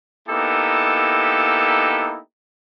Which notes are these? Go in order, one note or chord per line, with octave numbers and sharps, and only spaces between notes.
A#3 B3 D#4 E4 G4 A4